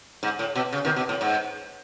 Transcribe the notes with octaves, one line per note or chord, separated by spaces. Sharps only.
G#2
A2
B2
C#3
B2 D#3
B2
A2
G#2